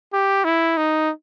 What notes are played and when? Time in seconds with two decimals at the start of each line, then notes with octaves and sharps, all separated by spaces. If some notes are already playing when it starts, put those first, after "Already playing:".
0.13 G4
0.45 E4
0.77 D#4